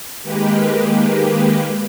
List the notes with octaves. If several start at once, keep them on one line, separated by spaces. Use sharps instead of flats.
D#3 G#3 A#3 G4 B4